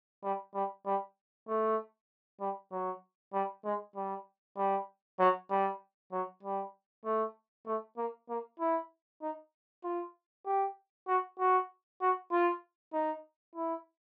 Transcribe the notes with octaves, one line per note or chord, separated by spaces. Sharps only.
G3
G3
G3
A3
G3
F#3
G3
G#3
G3
G3
F#3
G3
F#3
G3
A3
A3
A#3
A#3
E4
D#4
F4
G4
F#4
F#4
F#4
F4
D#4
E4